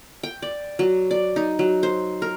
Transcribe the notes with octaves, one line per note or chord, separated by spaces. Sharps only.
G5
D5
F#3
D5
D#4
F#3
C5
A#4